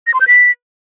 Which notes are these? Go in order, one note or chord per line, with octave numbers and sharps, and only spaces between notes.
A#6
C6
G6
B6